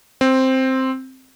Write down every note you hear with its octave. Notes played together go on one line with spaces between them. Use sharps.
C4